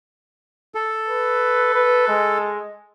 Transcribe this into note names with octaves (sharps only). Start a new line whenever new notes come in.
A4
B4
B4
G#3